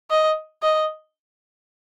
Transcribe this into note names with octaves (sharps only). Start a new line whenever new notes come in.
D#5
D#5